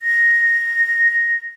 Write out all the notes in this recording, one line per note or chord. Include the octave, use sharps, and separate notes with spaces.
A#6